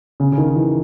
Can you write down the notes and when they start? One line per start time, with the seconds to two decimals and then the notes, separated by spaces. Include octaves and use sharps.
0.20 C#3
0.32 C#3
0.38 D#3
0.56 E3